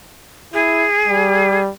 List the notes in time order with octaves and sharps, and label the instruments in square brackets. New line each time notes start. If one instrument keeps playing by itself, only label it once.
[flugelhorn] E4 [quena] G#4
[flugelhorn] G3